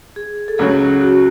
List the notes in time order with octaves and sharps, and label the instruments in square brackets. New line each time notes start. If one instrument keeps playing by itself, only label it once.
[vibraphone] G#4
A4
[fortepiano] C#2 C#3 F#3 [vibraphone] G#4
[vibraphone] F#4